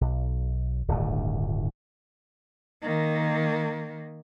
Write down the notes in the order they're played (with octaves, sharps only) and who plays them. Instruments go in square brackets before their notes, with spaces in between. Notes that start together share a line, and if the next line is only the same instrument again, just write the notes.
[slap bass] B1
D1 G1 D2 D#3
[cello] D#3 A#3